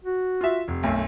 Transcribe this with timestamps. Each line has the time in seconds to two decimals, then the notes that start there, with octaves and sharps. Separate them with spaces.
0.04 F#4
0.41 F4 E5
0.68 F1
0.83 B1 F#2 A3